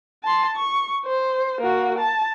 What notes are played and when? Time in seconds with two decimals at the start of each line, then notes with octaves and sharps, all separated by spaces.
0.23 A5 C6
0.56 C#6
1.05 C5
1.61 A#3 F#4
1.98 A5